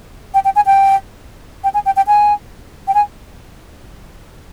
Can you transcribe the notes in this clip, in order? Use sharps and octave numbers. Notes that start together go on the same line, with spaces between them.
G5
G5
G#5
G5
G5
G#5
G5
G5
G#5
G5
G#5